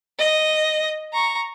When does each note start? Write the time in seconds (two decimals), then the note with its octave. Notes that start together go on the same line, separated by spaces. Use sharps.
0.19 D#5
1.13 A#5 C#6